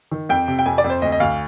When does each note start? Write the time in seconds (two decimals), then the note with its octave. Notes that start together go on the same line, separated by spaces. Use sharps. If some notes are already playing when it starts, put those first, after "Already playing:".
0.11 D#3
0.29 F2 G5
0.48 C3
0.59 G5
0.66 F2 G#5
0.78 D5
0.84 F2
0.90 C5
1.02 D2 D#5
1.12 D#5
1.20 D2 F5